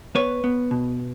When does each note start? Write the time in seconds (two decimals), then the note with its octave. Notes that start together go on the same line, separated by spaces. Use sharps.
0.15 B3 B4 C#5
0.44 B3
0.71 B2